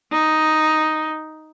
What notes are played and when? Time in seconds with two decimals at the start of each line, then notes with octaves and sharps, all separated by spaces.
0.12 D#4